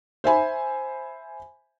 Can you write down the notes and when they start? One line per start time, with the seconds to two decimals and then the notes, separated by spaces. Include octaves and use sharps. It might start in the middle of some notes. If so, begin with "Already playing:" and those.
0.24 C5 E5 G#5 B5